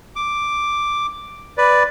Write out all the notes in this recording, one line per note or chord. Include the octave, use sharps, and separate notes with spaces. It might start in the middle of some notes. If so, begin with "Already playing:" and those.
D6
B4 D5